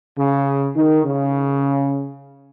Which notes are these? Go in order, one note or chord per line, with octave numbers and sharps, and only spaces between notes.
C#3
D#3
C#3